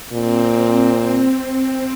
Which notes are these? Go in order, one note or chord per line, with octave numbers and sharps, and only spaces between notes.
A#2 C4
C4